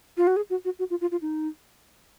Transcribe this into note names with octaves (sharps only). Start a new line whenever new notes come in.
F4
F#4
G#4
F#4
F#4
F#4
F4
F4
F4
D#4